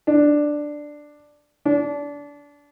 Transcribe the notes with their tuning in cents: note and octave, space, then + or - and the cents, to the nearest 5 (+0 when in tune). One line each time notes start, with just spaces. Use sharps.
D4 +5
D4 -25